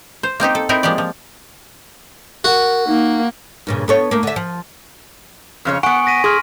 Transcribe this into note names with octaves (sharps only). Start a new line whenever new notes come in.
C5
A#3 C4 D#4 G4
A4
C4 D#4 E4 A#4
F3 G#3 A#3 G4 D5
F3
F#4 A#4
A#3 D#4
G2 A#2 C#3
B3 A4 C#5
A3 A#3
D3 E5
F3
F2 C#3 C#5
B3 F#5 G#5 C#6 D7
A#6 B6 D#7
G#4 C6 F6